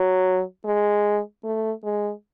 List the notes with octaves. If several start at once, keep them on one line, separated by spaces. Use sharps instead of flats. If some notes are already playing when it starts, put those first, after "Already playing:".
Already playing: F#3
G#3
A3
G#3